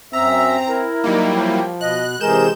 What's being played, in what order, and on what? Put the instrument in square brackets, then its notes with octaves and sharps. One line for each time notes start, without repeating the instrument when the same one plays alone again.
[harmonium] F#2 E5 [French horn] C4 [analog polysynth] A#5 [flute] E6
[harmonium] E4 [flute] A#4
[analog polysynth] F#3 G3 A#3 [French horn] D#4
[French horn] F3 [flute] G5
[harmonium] B2 [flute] D#5 [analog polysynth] F#6
[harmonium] C3 E3 G#4 [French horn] G#3 [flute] A#4 [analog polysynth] G6 E7